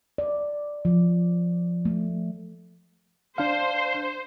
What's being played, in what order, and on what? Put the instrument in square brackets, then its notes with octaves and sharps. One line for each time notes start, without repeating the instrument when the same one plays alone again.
[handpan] D5
F3
A3
[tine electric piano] D4 F5 [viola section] C5